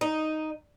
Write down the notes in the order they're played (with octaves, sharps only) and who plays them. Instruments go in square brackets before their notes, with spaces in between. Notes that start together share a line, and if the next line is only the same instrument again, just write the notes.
[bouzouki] D#4